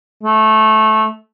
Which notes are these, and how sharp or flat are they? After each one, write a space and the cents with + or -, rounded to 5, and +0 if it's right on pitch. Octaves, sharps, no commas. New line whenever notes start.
A3 -15